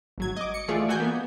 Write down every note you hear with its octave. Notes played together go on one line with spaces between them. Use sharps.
G#1 F#3 G#6
D#5 D6
C#7
E3 A3 F4 G#4 D5
E3 F#4 F#5 G#5 G6
A#3 B3